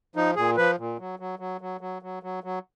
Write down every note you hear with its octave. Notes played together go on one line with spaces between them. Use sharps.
F3 D#4
A#2 G#4
F3 B4
A#2
F#3
F#3
F#3
F#3
F#3
F#3
F#3
F#3